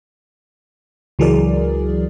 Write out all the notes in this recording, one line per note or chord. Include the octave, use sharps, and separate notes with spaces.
C#2 E3 F#3 G#4 A#4 D5